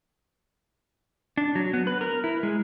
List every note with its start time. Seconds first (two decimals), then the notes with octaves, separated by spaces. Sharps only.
1.37 D4
1.55 F#3
1.74 B3
1.87 B4
2.01 A#4
2.24 E4
2.43 G#3